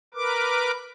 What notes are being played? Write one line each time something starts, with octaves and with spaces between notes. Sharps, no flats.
A#4 B4 D6